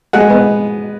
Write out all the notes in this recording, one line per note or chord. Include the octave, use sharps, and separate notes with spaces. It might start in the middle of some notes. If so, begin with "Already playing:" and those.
G#3 F#5
B3